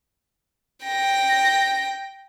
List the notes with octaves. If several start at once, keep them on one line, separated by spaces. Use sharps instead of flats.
G5 A#6